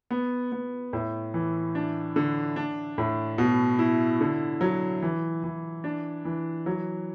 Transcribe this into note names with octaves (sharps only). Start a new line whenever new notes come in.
B3
B3
A2
E3
D4
D3
D4
A2
B2
E4
D3
F#3
E3
E3
D4
E3
F#3